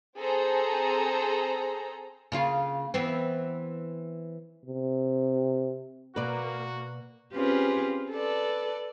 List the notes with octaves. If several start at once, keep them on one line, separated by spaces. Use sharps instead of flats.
C4 G#4 A4 C5 A#5
C#3 A#3 F4
E3 B3 C4
C3
B2 A#3 F#4 B4 D5
C4 C#4 F4 G4 G#4 B4
A4 B4 D5